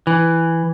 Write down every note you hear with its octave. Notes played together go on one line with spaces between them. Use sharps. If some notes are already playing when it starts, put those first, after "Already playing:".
E3